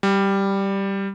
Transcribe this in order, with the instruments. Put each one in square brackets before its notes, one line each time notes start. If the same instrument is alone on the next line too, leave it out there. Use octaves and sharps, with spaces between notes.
[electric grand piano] G3